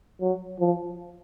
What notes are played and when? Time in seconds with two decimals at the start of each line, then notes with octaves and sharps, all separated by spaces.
0.21 F#3
0.60 F3